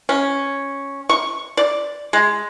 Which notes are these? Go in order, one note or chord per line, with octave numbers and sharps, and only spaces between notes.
C#4
C#6
D5
G#3